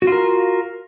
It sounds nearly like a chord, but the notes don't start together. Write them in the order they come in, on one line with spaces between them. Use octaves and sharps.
F#4 F4 A#4